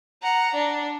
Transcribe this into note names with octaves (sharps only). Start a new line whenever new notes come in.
F#5 A#5
D4